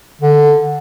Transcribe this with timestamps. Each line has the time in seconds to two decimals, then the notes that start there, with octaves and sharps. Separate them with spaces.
0.21 D3